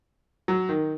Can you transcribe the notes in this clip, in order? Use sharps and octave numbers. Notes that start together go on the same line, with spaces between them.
F#3
D#3